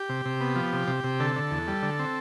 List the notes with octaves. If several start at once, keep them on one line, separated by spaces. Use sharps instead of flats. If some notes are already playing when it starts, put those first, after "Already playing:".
Already playing: G4
C3
C3
B3
F3
C3
C3
C3
D3 A4
D3
E2
G3
D3
C4